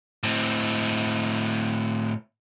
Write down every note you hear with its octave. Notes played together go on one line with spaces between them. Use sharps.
A2 C4